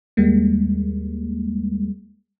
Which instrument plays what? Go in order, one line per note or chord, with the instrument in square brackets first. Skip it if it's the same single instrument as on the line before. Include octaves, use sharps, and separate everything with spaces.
[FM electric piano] D#2 G3 G#3 A#3